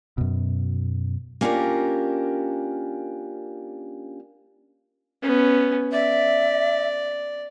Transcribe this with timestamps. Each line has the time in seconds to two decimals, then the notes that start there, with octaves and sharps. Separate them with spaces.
0.18 F#2 B2
1.41 A#3 C#4 D4 F4 G4 A#4
5.23 B3 C#4
5.93 D5 E5